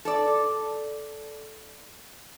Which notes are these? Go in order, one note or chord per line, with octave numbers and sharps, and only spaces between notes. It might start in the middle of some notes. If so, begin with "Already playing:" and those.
A4 D5